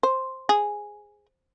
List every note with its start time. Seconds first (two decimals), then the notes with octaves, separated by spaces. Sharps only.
0.03 C5
0.49 G#4